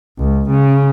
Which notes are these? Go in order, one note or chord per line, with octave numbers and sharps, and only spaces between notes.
C#2
C#3